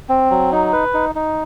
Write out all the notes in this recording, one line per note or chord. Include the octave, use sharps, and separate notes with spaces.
C4
F#3
D#4
B4
D#4
D#4